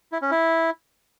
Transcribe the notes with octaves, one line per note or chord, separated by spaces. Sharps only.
E4
C#4
E4